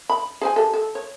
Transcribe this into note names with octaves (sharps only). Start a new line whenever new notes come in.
B5
G#4 C5 G#5
G4 A4
A4
C#5